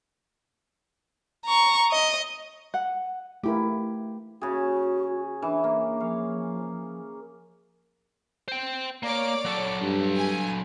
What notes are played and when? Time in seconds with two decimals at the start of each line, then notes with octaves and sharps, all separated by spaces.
1.46 A#5 C#6
1.92 D#5
2.74 F#5
3.43 A3 E4 G4 A#4
4.41 C#3 F#4 G#4
5.42 E3 D4
5.64 A#3
6.00 F3 C#5 F5
8.48 C5 G5
9.03 A#3 C#5 D5 D6
9.45 F#3 A4
9.81 G2
10.16 G#5